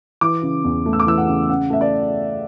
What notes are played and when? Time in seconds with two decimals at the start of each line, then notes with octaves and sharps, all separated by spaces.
0.21 E3 D6
0.42 C#3
0.64 E2
0.86 A3
0.93 E6
1.00 D6
1.06 E3 E6
1.18 F#5
1.27 C#3
1.49 C#4 F#5
1.70 A3 E5
1.81 D5